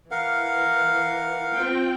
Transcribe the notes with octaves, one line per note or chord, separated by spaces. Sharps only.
E3 A#4 F5 F#5
C4 F4 G5